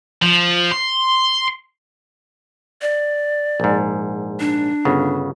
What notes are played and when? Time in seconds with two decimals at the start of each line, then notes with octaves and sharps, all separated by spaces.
0.22 F3
0.72 C6
2.82 D5
3.60 A#1 G#2
4.40 D4
4.85 G1 C#3 B3